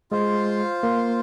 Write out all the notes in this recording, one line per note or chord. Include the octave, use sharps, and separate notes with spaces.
G#3 F4 C5 F5
A#3